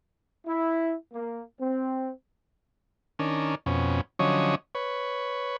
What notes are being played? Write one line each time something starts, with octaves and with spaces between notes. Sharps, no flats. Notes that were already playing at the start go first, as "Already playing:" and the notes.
E4
A#3
C4
D#3 C#4 D4 A#4
F2 B2 C#4
D3 F3 F#3 C#4 C#5 D#5
B4 C#5